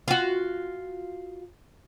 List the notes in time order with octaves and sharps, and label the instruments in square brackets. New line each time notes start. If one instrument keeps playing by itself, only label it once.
[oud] F4 F#4